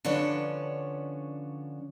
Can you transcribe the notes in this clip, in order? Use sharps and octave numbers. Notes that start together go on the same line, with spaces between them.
D3 F3 C#4 D4 B4 C#5